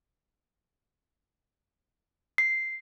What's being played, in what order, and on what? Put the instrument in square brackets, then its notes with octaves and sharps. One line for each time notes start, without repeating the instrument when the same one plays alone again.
[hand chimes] C7